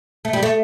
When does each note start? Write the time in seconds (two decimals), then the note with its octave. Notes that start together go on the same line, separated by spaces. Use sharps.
0.25 A3
0.33 G3
0.43 A3